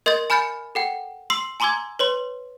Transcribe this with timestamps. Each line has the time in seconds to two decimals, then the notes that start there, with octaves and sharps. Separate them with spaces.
0.06 A#4 D#5 C6 G6 A6
0.30 G#5 B5 F6 G6 A6 C#7
0.75 A4 F#5 G5
1.30 C6 E6 C7
1.60 G#5 A#5 C6 D6 E6 G#6
1.99 B4 C#5 C6